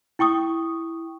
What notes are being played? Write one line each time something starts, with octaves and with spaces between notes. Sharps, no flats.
E4 G5 C#6 D#6